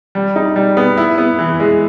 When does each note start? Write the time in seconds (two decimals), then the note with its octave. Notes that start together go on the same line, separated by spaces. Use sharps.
0.15 G3
0.36 D#4
0.56 G3
0.77 B3
0.97 E4
1.18 B3
1.39 E3
1.60 G#3